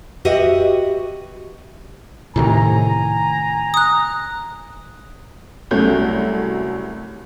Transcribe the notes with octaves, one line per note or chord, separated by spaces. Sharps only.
F#4 G4 B4 D#5 E5 F#5
A2 C3 D#3 G#5 A#5
D#6 F#6
C2 F#3 A3 C#4 G6